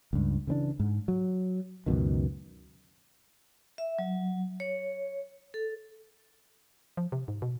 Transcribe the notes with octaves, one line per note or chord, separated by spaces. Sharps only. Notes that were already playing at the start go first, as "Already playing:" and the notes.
C#2 G2
C#3 E3 C4 D4
G#2
F#3
C#2 F#2 B2 D#3
E5
F#3
C#5
A4
F3
C3
G#2
B2